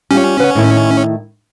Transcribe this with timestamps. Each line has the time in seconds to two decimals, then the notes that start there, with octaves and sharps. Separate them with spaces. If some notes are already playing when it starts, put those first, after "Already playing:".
0.11 G3 C#4 F4
0.39 C#3 B4 F#5
0.55 A2 D#3 E4